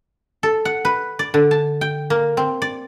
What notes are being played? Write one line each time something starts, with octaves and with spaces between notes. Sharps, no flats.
A4
F#5
B4
D5
D3
A5
G5
A#3
C4
D5